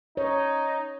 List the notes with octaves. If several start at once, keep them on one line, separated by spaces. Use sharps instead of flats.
D#4 C#5